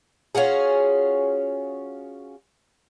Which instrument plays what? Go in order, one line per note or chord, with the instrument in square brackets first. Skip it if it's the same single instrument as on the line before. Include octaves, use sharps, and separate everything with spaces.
[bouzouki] C#4 F4 F#4 G#4